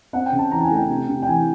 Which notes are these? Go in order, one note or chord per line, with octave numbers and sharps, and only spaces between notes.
C4 F#5
G5
C#3
A5
E3 A#5
A5
G#5
A3
G5
C3
C3
G5
E3 G#5